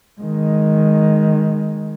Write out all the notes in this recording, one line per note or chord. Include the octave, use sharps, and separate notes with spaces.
D#3 G#3